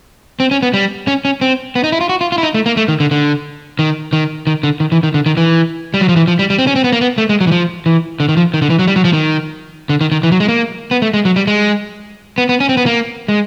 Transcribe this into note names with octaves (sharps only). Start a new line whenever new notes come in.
C4
C#4
B3
G3
C#4
C#4
C4
B3
D#4
E4
F4
F#4
F4
F4
E4
D#4
A3
A#3
A3
D#3
D3
D3
D#3
D#3
D#3
D3
D#3
E3
D#3
D3
D#3
E3
G3
F#3
F3
E3
F3
G3
G3
C4
C#4
C4
B3
A#3
B3
A3
G#3
F#3
E3
F3
E3
D3
D#3
F3
D#3
D3
E3
F#3
G3
F#3
F3
D#3
D3
D#3
D#3
E3
F#3
G#3
A#3
B3
A3
G#3
F#3
G3
G#3
B3
B3
C#4
C4
B3
A#3
G#3